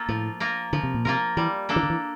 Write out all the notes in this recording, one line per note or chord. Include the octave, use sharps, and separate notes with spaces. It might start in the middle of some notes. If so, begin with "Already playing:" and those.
Already playing: A#3 F4 A4
A2 F3
A#3 F4 A#4
D3 F3
C3
A#2
C3 A#3 F4 A#4
E3 G3
A#3 D4 A4
E3
D3
E3